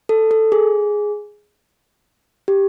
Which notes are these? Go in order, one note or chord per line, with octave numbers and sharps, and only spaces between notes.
A4
A4
G#4
G4